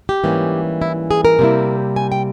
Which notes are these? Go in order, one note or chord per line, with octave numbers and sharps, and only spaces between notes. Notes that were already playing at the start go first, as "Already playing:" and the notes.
G4
G#2 E3 G3 A#3 C#4
E4
G#4
A#4
C3 G3 A#3 E4
G#5
G5